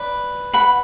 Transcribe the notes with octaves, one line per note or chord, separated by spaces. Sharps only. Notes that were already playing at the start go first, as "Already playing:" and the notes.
Already playing: B4 D5
F#5 B5